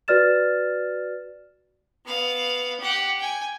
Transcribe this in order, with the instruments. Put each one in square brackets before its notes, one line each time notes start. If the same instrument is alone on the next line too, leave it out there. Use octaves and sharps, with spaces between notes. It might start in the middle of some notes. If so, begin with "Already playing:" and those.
[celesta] F#4 B4 D5 F6 A6 E7
[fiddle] B3 F5
G4 F#5
G5 G#5